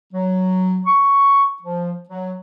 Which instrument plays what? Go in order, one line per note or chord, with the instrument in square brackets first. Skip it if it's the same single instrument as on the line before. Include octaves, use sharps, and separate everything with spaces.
[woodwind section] F#3
C#6
F3
F#3